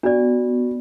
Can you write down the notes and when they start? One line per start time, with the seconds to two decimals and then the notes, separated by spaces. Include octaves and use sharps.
0.03 B3 D4 F#4 D5